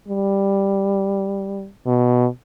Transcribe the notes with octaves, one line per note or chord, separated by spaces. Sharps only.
G3
B2